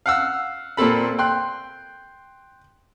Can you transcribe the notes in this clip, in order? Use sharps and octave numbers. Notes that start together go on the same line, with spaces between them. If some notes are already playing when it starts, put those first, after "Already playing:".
F5 F#5 E6
A#2 A#3 C4 A4 B5
G5 C6 F#6